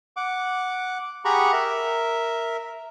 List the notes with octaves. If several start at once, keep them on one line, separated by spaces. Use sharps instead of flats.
F#5 D6
G4 G#4 F#5 A#5 B5 C#6
A#4 E5